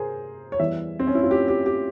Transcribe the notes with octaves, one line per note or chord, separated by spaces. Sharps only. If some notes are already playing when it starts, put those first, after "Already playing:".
Already playing: C3 G#4 A#4 C5
C#5
E2 E3 G3 E5
C4
C#4
E4
F4
G4
G4
G4